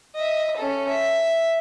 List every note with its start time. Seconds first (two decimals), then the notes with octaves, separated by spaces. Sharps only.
0.15 D#5 E5
0.57 C#4 A4
0.89 E5